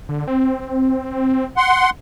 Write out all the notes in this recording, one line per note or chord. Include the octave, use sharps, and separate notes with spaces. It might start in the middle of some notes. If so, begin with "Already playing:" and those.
D3
C4
F#5 C6